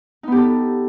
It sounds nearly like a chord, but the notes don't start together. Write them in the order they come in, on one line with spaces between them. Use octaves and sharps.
D#4 B3 G4 A4